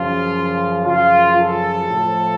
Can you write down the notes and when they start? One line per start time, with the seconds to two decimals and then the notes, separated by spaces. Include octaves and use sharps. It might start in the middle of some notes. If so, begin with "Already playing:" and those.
Already playing: F#2 C#3 F3 F4
0.84 F#2 C#3 F3 F4
1.37 A4
1.88 A2 F3